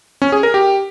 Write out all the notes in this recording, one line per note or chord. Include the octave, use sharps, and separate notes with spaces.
C#4
G#4
A#4
G4